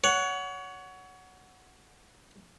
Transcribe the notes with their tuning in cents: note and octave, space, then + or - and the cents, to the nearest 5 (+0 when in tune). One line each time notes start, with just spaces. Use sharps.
C#5 +25 F#5 +0